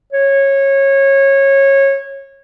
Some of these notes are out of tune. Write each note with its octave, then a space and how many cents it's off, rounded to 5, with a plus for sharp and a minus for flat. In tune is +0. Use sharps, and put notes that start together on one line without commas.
C#5 -20